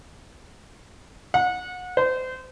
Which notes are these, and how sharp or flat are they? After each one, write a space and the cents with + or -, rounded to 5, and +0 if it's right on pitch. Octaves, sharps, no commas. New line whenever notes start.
F#5 -30
C5 -30